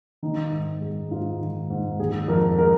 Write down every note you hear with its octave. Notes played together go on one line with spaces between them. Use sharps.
D#3 D#4
G#2
G#3
G#2 F4
D#3
G#2
D#3 G#4
F2 A#4
G#3 A#4